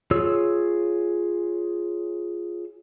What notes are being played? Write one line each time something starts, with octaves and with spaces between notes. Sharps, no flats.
F4 G#4 C#5 E6